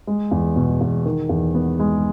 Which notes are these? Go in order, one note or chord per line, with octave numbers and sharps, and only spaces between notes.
G#3
E2
B2
E2
D#3
E2
B3
G#3